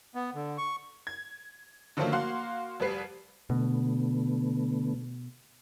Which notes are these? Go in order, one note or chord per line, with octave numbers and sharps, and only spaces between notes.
B3
D3
C#6
G#6
D3 D#3 F3 F#3 A3 A#3
A#3 F#4 F5 C6 F#6
F1 G3 B4 C7
B2 D3 A3 B3